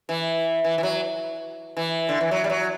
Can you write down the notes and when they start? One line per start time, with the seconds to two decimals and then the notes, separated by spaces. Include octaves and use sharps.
0.09 E3
0.64 E3
0.78 E3
0.83 F#3
1.77 E3
2.09 D3
2.21 E3
2.31 F#3
2.44 G3
2.50 F#3